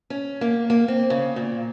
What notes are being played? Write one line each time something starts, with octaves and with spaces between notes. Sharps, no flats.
C#4
A#3
A#3
C4
C#3
A#2